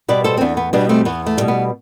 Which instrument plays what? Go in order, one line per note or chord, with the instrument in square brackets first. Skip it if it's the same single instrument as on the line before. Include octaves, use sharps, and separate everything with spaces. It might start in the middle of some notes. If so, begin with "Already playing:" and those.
[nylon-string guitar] B2 G3 B4 D5
A4 C5
C4
E2 B3 D4
B3
B2 G3 B3 D4
A3 C4
E2 B3
A3
B2 G3
B3